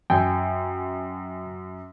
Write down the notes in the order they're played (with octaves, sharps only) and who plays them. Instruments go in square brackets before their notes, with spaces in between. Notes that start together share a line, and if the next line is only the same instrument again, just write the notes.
[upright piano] F#2 [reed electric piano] G5 G#5